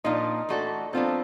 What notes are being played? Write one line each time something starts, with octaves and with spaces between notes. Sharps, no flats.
A#2 F3 A#3 D4 D#4 F4
E3 A3 D4 F#4 A4
F#3 B3 C4 D4 F4 A4